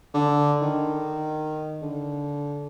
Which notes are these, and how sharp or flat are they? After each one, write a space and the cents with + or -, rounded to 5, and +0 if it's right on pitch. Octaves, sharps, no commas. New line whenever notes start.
D3 -5
D#3 -15
D3 -25